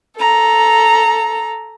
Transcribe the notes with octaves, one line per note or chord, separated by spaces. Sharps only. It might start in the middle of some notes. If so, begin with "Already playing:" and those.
A4 A#5